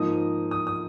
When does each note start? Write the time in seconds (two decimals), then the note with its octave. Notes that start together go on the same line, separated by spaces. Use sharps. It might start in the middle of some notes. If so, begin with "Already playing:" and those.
Already playing: G#2 F3 A#3 D#4 D#6
0.51 D#6
0.67 D#6